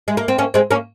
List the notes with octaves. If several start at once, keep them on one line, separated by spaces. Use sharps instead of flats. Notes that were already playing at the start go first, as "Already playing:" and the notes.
G#3
A#3
C4
A#3 C#4
G#3 C4
A#3 C#4